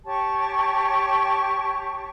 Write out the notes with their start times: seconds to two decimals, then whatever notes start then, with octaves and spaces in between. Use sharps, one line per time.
0.05 G4 C#5 A5 C#6